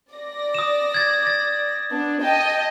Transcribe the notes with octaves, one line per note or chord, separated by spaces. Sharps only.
D5 A#6
D#6 E7
G#6 A6
A6
B3 D4
D#5 G5 A5